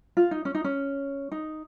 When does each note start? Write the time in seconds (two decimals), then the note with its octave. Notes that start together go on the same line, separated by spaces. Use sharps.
0.17 F4
0.31 D#4
0.45 C#4
0.55 D#4
0.64 C#4
1.32 D#4